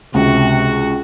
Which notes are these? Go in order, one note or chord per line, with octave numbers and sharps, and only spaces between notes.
C#2 C3 F#4